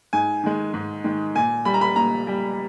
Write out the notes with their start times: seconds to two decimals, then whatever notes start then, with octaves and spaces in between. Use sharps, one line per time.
0.13 G#2 G#5
0.43 D#3 G#3
0.74 G#2
1.04 D#3 G#3
1.35 A#2 G#5
1.65 G3 B5
1.74 A#5
1.81 B5
1.96 A#2 A#5
2.27 G3